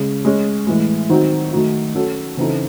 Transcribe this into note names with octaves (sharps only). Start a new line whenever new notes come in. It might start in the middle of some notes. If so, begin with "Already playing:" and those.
Already playing: C#3 G#3 C#4 G#4
G#3 C#4 G#4
A2 E3 G#3
D#3 F#3 C4 D#4
D#3 F#3 A3 D#4 F#4
F#3 C#4 F#4 A4
C#3 E3 C4 D#4 A4